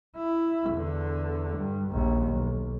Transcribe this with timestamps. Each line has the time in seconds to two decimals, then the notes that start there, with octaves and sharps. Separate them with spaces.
0.17 E4
0.72 E2 D3
1.57 G2
1.90 A#1 D#2
2.31 B1